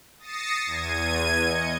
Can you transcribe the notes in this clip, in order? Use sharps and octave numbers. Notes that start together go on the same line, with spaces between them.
D#6 A6 A#6 C7 C#7 E7
E2 G#6 D#7
D#5 C#7